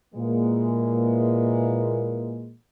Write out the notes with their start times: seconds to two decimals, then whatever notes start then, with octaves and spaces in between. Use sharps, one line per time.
0.14 A#2 E3 G#3 A#3